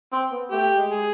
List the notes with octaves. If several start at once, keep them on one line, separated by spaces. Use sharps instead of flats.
C4
B3
A3 G4
G#3
G#3 G#4